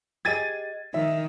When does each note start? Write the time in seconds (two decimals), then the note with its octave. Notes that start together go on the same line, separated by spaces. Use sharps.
0.25 G4 G#4 D#5 G#6 A6 D#7
0.94 D#3 E5